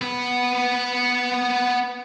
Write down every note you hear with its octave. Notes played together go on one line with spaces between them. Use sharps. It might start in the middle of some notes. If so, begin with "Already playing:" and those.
B3 B4